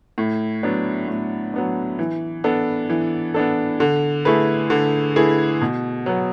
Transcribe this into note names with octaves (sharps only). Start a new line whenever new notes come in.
A2
F#3 B3 D4
A2
F#3 B3 D4
E3
B3 D4 A4
E3
B3 D4 A4
D3
A3 E4 G#4 B4
D3
A3 E4 G#4 B4
B2
F#3 B3